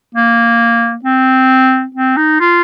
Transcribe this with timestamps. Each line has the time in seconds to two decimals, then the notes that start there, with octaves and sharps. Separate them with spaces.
0.15 A#3
1.05 C4
1.95 C4
2.17 D#4
2.40 F4